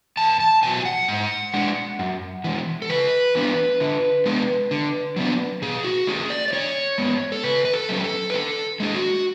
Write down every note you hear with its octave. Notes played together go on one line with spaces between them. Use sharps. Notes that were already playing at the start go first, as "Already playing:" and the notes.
E2 A5
A5
B2 F#3 G#5
F#5
G#2
G#3 D4
F#2
E3 G#3
A4
C#3 B4
E3 B3 D4
D3
G#3 B3 D4
D3
F#3 B3 D4
B2 G#4
F#4
A3 C#4 G#4
D5
D5
D3 C#5
G#3 B3
A4
C#3 B4
B4
A4
F#3 C#4
B4
A4
B4
D3 A4
G#3 D4 G#4
F#4